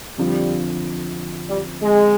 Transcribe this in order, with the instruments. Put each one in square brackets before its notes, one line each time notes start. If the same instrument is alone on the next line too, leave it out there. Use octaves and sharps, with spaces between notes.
[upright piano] F2 D3 F3 [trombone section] G3
[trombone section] G3
G#3